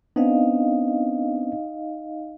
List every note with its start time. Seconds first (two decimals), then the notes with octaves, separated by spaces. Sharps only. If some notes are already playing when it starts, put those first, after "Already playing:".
0.16 B3 C4 D4 D#4 D#5 F5